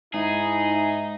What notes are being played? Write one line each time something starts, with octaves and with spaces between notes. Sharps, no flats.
G#2 D#4 E4 G#4